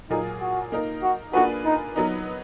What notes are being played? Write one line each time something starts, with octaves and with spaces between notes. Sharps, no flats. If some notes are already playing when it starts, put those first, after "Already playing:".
A#2 F#3 A#3 D#4 F4 G#4
F#4
A#3 D#4 A#4
F#4
A#3 D4 F4 F#4 G#4 B4
D#4
F#3 B3 D#4 A#4